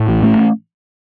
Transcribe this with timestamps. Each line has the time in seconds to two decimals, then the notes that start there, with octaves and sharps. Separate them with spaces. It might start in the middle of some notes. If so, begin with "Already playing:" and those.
Already playing: A2
0.09 A1
0.23 A1 A3 C#4